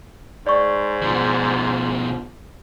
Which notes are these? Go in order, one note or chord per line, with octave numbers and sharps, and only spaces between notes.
G#2 D5 C#6
B2 F3